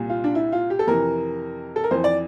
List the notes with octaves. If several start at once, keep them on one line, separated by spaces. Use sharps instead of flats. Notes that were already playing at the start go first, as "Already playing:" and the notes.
Already playing: C2 A#2
F4
D4
E4
F4
G4
A4
F2 C3 E3 A#4
A4
A#4
F2 E3 C5
D5